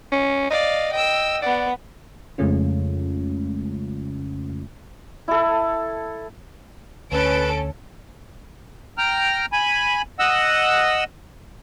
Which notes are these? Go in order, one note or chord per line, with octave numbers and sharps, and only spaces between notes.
C#4
D5 D#5 F5
D#5 G5 E6
B3 D5 F#5
F2 C#3 G#3 A3 C#4 F4
E4 A4
D2 C#4 A4 B4 D7
G5 A#5 F6
G#5 B5
D#5 F#5 E6